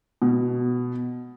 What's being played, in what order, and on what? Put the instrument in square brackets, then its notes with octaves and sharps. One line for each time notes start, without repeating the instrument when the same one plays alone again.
[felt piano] B2